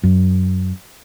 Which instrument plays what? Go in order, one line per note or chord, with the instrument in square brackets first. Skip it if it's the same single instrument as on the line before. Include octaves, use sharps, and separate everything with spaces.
[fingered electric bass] F#2